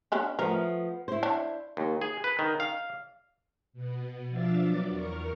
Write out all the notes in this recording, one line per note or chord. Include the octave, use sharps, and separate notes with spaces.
B3 C#4 D4
F3 A3 B3 A#4
E4 C5
D4 C#5
D#2
G#4
B4
D#3
F5
B2 B3
F3 D4 D5 E5 F5 A6
F#3 B3 D5 D6
E2 A#4 C#6 F6